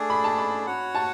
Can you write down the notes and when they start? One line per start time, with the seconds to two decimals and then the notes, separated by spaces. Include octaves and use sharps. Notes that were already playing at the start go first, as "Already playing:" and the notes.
Already playing: A3 D4 G#4
0.10 B5
0.24 A5
0.38 B5
0.67 F#4 C#5 F#5
0.95 A5